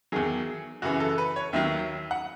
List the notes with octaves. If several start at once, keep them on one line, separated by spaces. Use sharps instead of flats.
E2 D#3 F#3 G#4
F#2 C#3 E3 F#4
A4
B4
C#5
D#2 D#3 F#3 E5
F#5